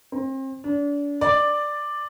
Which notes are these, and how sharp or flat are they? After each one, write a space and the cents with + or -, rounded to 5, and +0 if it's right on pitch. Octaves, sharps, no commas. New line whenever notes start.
C4 +35
D4 -35
D5 +5